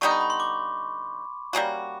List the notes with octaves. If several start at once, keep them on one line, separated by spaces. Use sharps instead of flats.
D3 G3 B3 D#4 C#6
B5
B5
C6
D6
G3 A#3 C#4 F#4